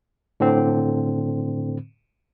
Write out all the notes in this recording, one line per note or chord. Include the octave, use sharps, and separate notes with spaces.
A2 D3 C4